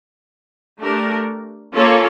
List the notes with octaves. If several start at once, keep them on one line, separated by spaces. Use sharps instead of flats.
A3 D4 G4 A#4
A#3 C#4 F4 A4 C#5